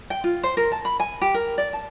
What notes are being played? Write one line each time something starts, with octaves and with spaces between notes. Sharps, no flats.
G5
F4
C5
A#4
A5
B5
G#5
G4
A#4
D5
A5